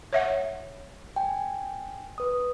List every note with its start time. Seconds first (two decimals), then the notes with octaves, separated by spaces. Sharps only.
0.13 C#5 E5 F#5
1.16 G5 G#5
2.18 B4 D#6